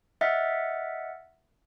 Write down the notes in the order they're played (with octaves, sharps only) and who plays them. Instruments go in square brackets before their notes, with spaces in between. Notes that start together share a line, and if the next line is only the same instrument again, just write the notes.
[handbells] D#5 E5 F#5 F6 A6